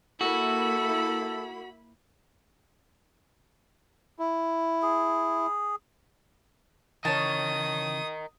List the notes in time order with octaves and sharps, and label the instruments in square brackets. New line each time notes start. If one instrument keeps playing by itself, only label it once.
[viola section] A#3 E4 B5 [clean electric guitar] F#4 [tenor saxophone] A4
[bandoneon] E4
[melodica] G#4
[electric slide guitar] C#3 E3 [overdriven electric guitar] A#4 D#5 [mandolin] C#5 A5 [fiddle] D#6